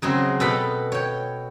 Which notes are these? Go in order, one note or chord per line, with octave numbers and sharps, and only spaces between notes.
C#3 F#3 G#3 C4
B2 A4 B4 G5 B5
C#5 G5